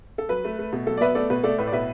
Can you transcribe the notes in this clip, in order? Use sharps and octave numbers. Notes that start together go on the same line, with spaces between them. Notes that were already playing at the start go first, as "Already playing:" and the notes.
A4
F#3 B4
A3
A3
B2
F#3 A4
D5
B3 B4 E5
A3 A4 D5
B2 B4
A3 A4 D5
A2 B4 E5
D5
B2 B4 E5